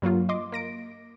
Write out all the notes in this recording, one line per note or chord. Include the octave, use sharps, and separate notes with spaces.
G2 F#3 A#3 F4
D#5 C6 D6
A#3 A#6 D7